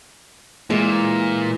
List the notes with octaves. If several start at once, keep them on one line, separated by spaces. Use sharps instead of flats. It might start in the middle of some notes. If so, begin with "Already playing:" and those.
A#2 E3 G#3